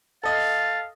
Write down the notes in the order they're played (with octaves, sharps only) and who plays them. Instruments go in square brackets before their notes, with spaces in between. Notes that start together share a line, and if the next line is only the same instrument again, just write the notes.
[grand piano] A4 D#5 [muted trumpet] F5 [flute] A6